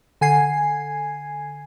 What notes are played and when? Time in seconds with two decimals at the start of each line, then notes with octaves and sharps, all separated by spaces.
0.21 D3 G#5 G#6 C7